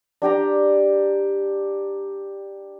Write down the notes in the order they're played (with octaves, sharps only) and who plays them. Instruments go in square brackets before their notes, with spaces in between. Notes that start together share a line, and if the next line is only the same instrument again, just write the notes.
[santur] D4 G4 G5 A#5